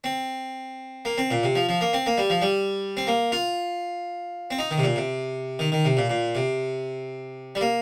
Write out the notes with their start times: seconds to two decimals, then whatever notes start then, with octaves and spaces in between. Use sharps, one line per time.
0.04 C4
1.05 A#3
1.18 C4
1.31 A#2
1.43 C3
1.55 F3
1.69 F3
1.81 A#3
1.93 C4
2.06 A#3
2.18 G3
2.30 F3
2.42 G3
2.97 C4
3.07 A#3
3.32 F4
4.51 C4
4.59 D#4
4.71 D#3
4.78 C3
4.83 A#2
4.96 C3
5.59 D#3
5.72 D#3
5.85 C3
5.97 A#2
6.10 A#2
6.35 C3
7.55 G3
7.61 A#3